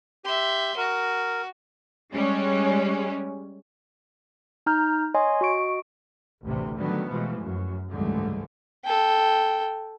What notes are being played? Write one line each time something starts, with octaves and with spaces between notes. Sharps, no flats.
G4 E5 C6
F#4 A#4
G3 G#3 C#4
D#4 A#5 F6 G6
C#5 D#5 G#5 C6
F#4 D#5 C#6 D7
A1 D2 A2 C3 E3
D3 D#3 F#3 G3 A3 B3
B2 E3 F3 G#3 A3
F#2
C#2 G#2 D3 E3 G3 A3
A4 G5